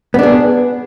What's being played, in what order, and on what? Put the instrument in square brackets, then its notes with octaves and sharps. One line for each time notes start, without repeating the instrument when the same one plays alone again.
[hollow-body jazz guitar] B3
D4
G#4